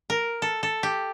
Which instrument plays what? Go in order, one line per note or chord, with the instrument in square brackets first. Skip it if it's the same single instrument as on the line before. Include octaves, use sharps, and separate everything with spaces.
[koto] A#4
A4
A4
G4